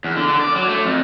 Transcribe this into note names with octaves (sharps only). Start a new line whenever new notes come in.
E2
D3
D3
D5
F#3
A3
F2